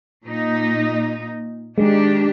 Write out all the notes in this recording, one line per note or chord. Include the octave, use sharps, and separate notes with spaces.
A#2 D#4
D#3 G#3 D4 G4